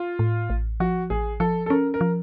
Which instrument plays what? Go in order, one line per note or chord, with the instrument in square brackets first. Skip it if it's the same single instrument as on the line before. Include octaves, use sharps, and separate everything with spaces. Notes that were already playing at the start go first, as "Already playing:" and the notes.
Already playing: [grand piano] F4
[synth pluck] A2
A1
[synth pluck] F3 [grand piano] F#4
[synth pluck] A1 [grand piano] G#4
[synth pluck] F3 [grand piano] A4
[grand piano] A4
[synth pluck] C#4 [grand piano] A#4
[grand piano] A#4
[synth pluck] F3